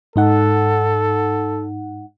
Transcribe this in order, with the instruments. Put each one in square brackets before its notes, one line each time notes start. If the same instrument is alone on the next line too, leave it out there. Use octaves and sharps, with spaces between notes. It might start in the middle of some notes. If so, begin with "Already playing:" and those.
[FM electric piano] G#2 D#4 F#5 [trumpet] A4